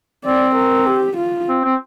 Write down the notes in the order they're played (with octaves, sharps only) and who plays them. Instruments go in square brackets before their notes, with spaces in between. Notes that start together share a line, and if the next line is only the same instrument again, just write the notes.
[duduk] C4 [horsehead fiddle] D5
[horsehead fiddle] A#4
G4
F4
[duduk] C4
C4